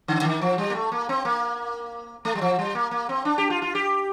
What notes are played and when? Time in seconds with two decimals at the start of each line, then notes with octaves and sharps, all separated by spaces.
0.08 D3
0.22 D3
0.25 D#3
0.41 F3
0.58 G3
0.70 A#3
0.75 A3
0.92 A#3
1.09 C4
1.25 A#3
2.25 A3
2.35 G3
2.41 F3
2.59 G3
2.75 A#3
2.91 A#3
3.09 C4
3.25 D4
3.38 G4
3.50 F4
3.62 F4
3.75 G4